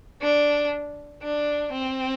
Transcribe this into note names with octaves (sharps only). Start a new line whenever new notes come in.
D4
D4
C4